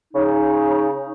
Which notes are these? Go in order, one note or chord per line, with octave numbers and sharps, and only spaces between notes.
C#3 D#4